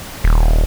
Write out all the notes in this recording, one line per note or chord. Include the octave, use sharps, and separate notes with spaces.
D#1